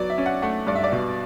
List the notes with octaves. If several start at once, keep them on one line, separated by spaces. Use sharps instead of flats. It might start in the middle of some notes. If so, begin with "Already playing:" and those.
Already playing: F#3 B3 D5
E5
C#4
F#5
A3 F#5
G2 D5
E5
D5
B2